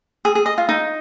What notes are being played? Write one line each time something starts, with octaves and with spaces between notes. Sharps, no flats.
G#4
G#4
D#5
F4
D#4